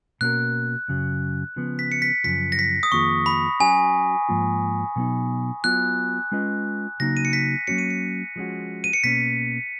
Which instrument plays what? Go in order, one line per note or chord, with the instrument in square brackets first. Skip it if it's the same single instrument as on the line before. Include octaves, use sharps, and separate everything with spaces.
[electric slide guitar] B2 A#3 C#4 F#4 A#4 [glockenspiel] F#6
[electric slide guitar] F#2 C#3 F#3
C#3 F3 B3
[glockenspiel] B6
C#7
B6
[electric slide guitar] F#2 C#3 F3 [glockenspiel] B6
[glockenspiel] A#6
B6
D#6
[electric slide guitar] F2 D#3 A#3 F4 G#4 [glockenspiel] C#6
[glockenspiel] B5
[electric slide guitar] F#3 C#4 F#4 C#5 [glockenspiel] G#5
[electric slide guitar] G#2 F3 A#3 F4
B2 F#3 B3 D#4
[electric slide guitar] F#3 B3 F4 [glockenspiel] F#6
[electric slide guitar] G#3 C#4 F4 B4 D#5
[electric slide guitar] C#3 F#3 A#3 D#4 [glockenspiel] A#6
[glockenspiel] D#7
C#7
B6
[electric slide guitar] F#3 A#3 C#4 F#4 C#5 [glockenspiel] C#7
[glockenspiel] D#7
C#7
[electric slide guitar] F3 G#3 C#4 F#4
[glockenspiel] D#7
C#7
[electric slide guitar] B2 A#3 C#4 [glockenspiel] B6